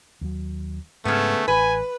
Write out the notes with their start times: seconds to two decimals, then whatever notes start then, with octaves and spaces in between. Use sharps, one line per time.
0.21 D#2 F#3
1.05 G#2 C#3 A3 B3
1.48 A1 B4 G#5